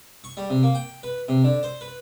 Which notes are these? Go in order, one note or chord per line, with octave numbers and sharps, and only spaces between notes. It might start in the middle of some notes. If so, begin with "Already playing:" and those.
C#6
G3
C3
A#3
G5
B4
C3
D3
C5
B4